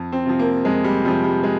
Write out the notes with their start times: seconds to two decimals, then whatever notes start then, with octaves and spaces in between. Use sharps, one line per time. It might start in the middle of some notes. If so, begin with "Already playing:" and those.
Already playing: F2
0.12 C4
0.26 C3 F3
0.39 A#3
0.65 F2 G#3
0.84 G3
1.04 C3 F3 G3
1.24 G3
1.43 G#3